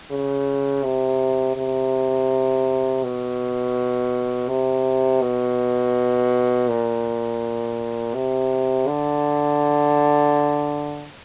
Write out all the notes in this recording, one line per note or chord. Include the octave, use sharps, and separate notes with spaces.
C#3
C3
C3
B2
C3
B2
A#2
C3
D3